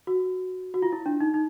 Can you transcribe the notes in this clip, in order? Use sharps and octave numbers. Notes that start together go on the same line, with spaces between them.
F#4
F#4
F4
E4
D4
D#4
D#4